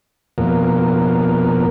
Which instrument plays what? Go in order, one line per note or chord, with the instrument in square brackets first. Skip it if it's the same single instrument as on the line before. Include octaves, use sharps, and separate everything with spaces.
[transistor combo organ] F2 B2 A#3